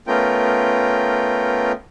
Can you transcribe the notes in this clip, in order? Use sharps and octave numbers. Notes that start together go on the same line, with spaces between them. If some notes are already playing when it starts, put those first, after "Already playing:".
A3 B3 C#4 F4 A#4 G5